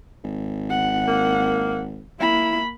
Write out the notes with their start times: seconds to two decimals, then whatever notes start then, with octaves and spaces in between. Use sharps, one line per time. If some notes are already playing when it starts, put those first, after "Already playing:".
0.24 G#1
0.70 F#5
1.08 A#3
2.20 A#3 E4 B5